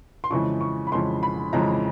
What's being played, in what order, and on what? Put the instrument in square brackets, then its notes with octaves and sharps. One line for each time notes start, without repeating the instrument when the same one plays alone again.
[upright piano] C6
F2 C#3 E3 G#3 C#6
C#6
B5
F2 C#3 E3 G#3 C6
B5
F2 C#3 E3 G#3 A#5